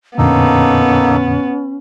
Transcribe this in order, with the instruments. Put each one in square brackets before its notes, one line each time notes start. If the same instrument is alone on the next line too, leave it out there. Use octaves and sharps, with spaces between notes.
[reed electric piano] F2 A#2 D3 [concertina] A#3 D#4 A4 [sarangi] B3 [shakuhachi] C#4